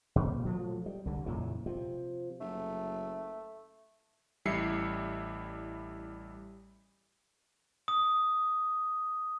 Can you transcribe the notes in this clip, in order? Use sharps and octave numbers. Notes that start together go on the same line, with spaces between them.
A#2
F3 F#3 A3
G3
C2 D3
F2 A#2 C#3 E3
C3 F3
F#1 A3
A1 G3 E4 C7 C#7
D#6